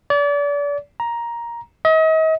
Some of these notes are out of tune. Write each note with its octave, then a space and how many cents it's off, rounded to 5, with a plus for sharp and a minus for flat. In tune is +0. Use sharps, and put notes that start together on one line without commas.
D5 -35
A#5 +10
D#5 +40